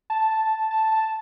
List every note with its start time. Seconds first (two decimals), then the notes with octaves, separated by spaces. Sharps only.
0.10 A5
0.71 A5
0.91 A5